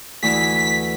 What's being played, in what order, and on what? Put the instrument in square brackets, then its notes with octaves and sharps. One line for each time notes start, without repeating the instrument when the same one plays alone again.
[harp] D2 E3 E4 [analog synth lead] B6